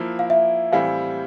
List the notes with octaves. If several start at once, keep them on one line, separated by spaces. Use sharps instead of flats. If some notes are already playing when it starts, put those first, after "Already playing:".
Already playing: F3 A#3 E4
F5
E5
A2 E3 G3 C4 E4 F5